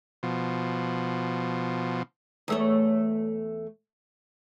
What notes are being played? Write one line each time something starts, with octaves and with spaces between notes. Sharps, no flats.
B2 F3
E2 A3 C#5